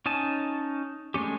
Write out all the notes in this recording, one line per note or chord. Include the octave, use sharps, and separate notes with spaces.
C#4 D#4 G#5 A5
G#3 A3 C#4 G4